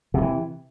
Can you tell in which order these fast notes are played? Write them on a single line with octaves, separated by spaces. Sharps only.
C3 D#3 E3